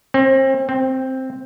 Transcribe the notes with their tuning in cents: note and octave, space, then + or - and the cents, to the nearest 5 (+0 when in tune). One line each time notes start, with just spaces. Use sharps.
C4 +35
C4 +5